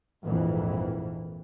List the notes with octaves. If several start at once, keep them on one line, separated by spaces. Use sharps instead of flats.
A#1 F2 G#2 E3